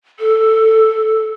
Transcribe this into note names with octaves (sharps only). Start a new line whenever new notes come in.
A4